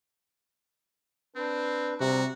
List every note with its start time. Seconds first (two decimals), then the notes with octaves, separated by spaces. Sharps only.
1.36 C4 D4 B4
2.00 C3 G3 F#4 A#5